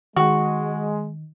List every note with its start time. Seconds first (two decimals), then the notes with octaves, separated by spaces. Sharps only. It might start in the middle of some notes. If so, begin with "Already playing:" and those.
0.16 D#3 G#3 F#4